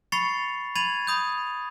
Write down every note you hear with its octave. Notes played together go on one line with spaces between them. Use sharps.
B5 C#6 A6 C7 C#7 F7
B5 G#6 A6 D#7 F7 F#7
B5 D#6 G6